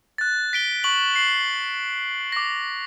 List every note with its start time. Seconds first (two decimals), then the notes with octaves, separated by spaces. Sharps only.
0.18 F#6 A6
0.53 B6 D7 G7
0.84 C#6 F#7
1.16 C7 F#7
2.32 D6 A#6